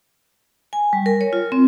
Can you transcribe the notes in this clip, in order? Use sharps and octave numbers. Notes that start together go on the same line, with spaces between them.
G#5
G3
A#4
C#5
F4
C4